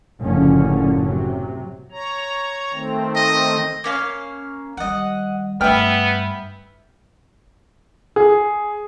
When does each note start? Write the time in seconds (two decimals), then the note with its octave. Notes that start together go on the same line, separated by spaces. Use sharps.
0.21 F#1 A2 D3 F3 C#4
1.05 C3 F#3
1.91 C#5 A#5
2.73 D#3 A3 C4
3.16 D#5
3.84 A#3 C#4 F5
4.77 D#3 G3 D#5 F#5
5.61 G2 A3 B3 B4 E5 G5 F6
8.16 G#4